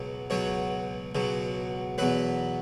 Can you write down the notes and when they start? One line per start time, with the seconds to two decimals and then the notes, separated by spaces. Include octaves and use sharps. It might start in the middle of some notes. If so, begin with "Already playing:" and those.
Already playing: C#2 B2 F#3
0.30 C#2 B2 F#3 C#5
1.15 C#2 B2 F#3
1.98 E2 B2 F#3 B4